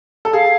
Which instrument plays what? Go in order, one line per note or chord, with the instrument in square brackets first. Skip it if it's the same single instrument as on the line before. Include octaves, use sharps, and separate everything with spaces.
[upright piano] A4
[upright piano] G#4 [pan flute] F5